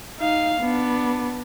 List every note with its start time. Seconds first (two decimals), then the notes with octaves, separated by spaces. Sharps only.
0.19 D#4 F5
0.61 B3 D4